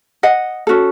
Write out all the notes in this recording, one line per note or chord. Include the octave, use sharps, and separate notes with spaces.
D#5 F#5
C#4 F#4 A4